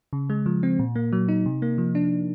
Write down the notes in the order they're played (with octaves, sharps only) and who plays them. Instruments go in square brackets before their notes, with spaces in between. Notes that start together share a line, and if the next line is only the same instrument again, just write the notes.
[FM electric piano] C#3
G#3
F3
C4
A#2
A#3
F#3
D#4
C3
A#3
F3
D4